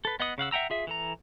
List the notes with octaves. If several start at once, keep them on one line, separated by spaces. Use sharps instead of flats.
A4 B4
B3 D#5 F#5 D#6
C#3 F5 F#5 E6
E5 F#5 G5 A#5 E6
F4 G#4 E5
E3 A4 A#5